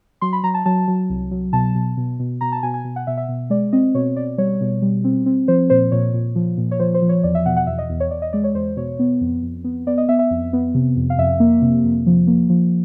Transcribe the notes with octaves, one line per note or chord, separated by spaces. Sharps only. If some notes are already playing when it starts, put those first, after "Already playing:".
F#3 C6
B5
F#3 A#5
A5
F#3 A5
F#3
C2
F#3
B2 A5
B2
B2
B2
B2 A#5
A5
B2 G#5
G#5
B2
F#5
B2 E5
E5
B2
G#3 D5
C4 D#5
B2 C#5
B2 D5
G3 C#5
B2
G3
C4
C4
F3 C5
A#2 C5
A#2 C#5
A#2
F3
A#2
C#5
F3 C5
C5
F3
C#5
E2 D5
E5
B2 F#5
F#5
E2 E5
D#5
E2
C#5
E2 D5
D#5
G#3 D5
C#5
E2 C5
B2 C#5
B3
F2
F2
B3
B3 D5
D#5
B3 E5
E5
F2
B3
C3
F2
F5
F2 E5
A#3
C3
F2
F3
A#3
F3